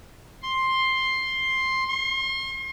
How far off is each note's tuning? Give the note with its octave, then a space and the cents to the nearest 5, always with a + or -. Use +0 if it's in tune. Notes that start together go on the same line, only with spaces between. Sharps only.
C6 +10
C6 +40